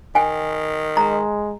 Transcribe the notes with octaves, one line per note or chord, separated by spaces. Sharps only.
D#3 G5 G#5
G#3 A#5